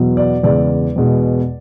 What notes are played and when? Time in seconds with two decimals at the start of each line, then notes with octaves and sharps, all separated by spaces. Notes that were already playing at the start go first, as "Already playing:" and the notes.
Already playing: E2 B2 F#3
0.17 D5
0.43 E2 C#3 G#3 D5
0.96 E2 B2 G#3